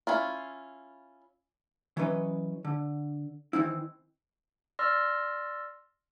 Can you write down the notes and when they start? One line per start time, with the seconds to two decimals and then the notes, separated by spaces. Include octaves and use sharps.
0.07 C#4 E4 F4
1.97 E3 F#3 C#4 B4 D#5
2.65 D3
3.53 D#3 E3 C4 E4
4.79 D5 C6 E6 F6 A#6